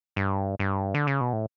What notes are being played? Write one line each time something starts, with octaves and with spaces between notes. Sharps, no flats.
G2
G2
D3
C#3
B2
A2